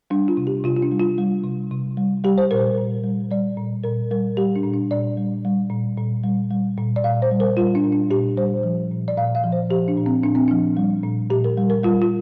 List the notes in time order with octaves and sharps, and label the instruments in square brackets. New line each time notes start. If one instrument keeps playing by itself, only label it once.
[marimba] G3 D4
F4
C3
G4
C3 F4
F4
D4
G3
F4
G3
C3
C3
G3
G3 G4
C5
A#2 A#4
A#2
G3
G3 D5
A#2
A#2 A#4
G3 A#4
G3 G4
D4
A#2
D4
A#2 D5
G3
G3
A#2
A#2
G3
G3
A#2
D5
A#2 F5
C5
G3
A#4
G3 F4
D4
A#2
D4
A#2 G4
G3 C5
F3
A#2
D5
A#2 F5
F5
F3
C5
F3 G4
D4
A#2
C4
A#2 D4
C4
F3 D4
G3
A#2
A#2 G4
A#4
G3
A#4
G3 F4
F4